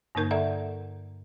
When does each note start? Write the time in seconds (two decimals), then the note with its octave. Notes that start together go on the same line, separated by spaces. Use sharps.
0.15 G2 D3 A#3 D#4 A#4 G6
0.31 A4 A#4 D5 E5 F#5 A#5